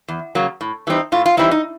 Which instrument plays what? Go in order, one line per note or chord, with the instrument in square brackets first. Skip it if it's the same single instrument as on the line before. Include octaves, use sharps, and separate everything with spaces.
[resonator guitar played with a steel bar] E2
C#3 F#3 A#3
A2
E3 G3 C4 D#4
A2 F4
F4
E3 G3 C4 D#4 E4
D#4